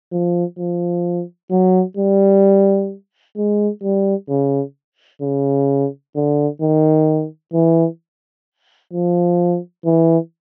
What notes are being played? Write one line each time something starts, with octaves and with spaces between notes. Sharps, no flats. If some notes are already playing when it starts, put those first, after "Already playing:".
F3
F3
F#3
G3
G#3
G3
C#3
C#3
D3
D#3
E3
F3
E3